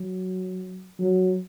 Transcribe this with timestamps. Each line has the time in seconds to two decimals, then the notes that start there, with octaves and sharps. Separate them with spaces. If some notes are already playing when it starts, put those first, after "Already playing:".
Already playing: F#3
0.99 F#3